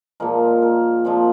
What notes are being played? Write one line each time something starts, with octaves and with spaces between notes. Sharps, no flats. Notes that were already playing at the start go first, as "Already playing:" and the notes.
A#2 F3 G#3 A#4
A#4
A#2 F3 G#3 C4